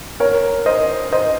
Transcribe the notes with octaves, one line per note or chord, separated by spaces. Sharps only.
A#4 C#5
C5 D#5
C5 D#5